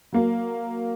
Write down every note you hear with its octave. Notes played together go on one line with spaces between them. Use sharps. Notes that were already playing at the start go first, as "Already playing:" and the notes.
F#3 A#3